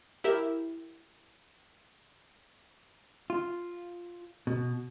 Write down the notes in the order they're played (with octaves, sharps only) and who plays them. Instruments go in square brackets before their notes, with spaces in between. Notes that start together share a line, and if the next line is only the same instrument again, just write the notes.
[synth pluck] E4 G4 A#4 E5
[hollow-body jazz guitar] F4
B2